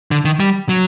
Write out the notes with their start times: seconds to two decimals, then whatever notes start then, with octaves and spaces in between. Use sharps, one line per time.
0.11 D3
0.25 D#3
0.40 G3
0.69 F#3